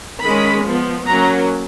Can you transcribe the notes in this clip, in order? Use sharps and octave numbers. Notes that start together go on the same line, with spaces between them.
D#3 G#3 C#4 B5
F3 B3
F#3 A#3 C#4 A#5